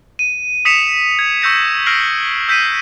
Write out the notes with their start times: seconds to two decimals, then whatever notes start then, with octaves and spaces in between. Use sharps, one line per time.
0.19 D#7
0.65 D#6 B6 C#7 E7 F7
1.19 G#6
1.42 C#6 E6 G6 A#6 C#7
1.86 E6 F6 A#6 C7 D7 F#7
2.48 E6 G6 B6 C7 D#7